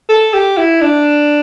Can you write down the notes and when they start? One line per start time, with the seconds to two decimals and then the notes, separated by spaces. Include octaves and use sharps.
0.09 A4
0.34 G4
0.58 E4
0.81 D4